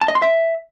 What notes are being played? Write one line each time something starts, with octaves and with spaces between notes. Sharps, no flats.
A5
D#5
C6
E5